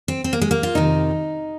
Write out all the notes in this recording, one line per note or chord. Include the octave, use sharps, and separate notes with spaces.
C4
C4
A#3
G#3
A#3
F4
F2 C3 D#3 D#4